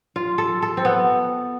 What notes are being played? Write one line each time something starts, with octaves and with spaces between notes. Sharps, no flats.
F4
A4
A4
C4
B3